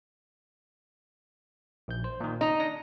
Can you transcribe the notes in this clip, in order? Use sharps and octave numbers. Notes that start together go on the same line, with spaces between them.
A#1 G6
C5
A#2 D#3
D#4 D#5 A#5
D4 A#6